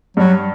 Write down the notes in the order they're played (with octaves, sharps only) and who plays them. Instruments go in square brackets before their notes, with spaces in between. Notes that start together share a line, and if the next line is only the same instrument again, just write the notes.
[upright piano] G2 [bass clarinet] F#3